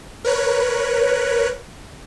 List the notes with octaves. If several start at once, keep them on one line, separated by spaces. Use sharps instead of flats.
A#4 B4 C#5 F#6